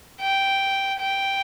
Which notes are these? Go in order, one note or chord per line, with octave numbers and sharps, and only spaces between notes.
G5
G5